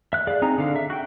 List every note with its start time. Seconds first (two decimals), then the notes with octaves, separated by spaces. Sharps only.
0.13 E5 F#6
0.27 G#4 D5 F5
0.42 C4 D#4 G#4 A#5
0.58 D3 F5
0.76 E5
0.90 F#4 G5